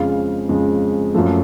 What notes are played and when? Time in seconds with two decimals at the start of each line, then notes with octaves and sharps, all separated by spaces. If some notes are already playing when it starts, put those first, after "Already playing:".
Already playing: F2 C#3 G#3 F5
0.49 F2 C#3 G#3
1.14 F#2 F3 A3